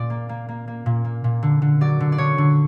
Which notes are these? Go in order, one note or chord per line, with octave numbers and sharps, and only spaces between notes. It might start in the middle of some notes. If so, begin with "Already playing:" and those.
Already playing: A#2 D5
A#3
A#3
A#3
A#3
A#2
A#3
A#2
D3
D3
F#3 D5
D3
D5
D3 C#5
D3